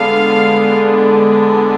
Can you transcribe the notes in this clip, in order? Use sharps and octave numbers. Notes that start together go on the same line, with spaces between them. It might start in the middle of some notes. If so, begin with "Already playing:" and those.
Already playing: D3 G#3 B3 D4 F5